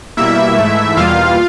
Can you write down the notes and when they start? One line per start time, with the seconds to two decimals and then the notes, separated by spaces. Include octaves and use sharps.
0.17 B2 G3 A#3 E4 E5
0.57 G#2 E3 A3
0.97 E2 B2 G3 A#3 F4 F5